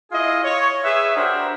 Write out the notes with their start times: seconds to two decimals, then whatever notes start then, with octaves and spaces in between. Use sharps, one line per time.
0.12 E4 F4 G#4 D#5
0.44 C#5
0.84 G#4 B4 E5
1.16 D4 F#4 G4 A#4 C5